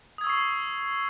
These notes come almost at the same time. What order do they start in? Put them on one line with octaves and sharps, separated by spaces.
D#6 G#6 E6 C#6 C7